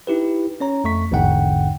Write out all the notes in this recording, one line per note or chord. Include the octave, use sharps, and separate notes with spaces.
D#4 E4 G4 B4
C#4 C#5 A#5
F2 A3 C#6 B6
A1 E2 G#2 D3 F#5 G5